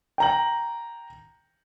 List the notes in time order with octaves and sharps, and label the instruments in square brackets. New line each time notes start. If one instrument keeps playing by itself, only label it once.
[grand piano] G5 A#5 F#7